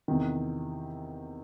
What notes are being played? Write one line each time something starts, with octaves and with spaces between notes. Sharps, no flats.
E2 C3 D#3